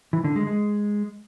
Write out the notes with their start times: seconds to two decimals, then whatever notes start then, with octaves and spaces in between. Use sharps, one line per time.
0.13 E3
0.24 D3
0.36 G#3
0.47 G#3